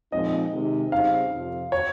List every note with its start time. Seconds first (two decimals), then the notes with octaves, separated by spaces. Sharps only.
0.11 A#2 F3 G#3 C4 D#4 D#5
0.52 C3 D#3 G#3 D#4
0.91 C#3 G3 C4 D#4 F5
1.32 F2 C3 F3
1.72 C#5